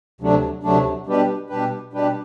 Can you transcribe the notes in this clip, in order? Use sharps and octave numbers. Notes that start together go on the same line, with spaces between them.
D2 C3 F#3 A3 D4
D2 C3 F#3 A3 D4
B2 G3 D4 G4 B4
B2 G3 D4 G4 B4
B2 G3 D4 G4 B4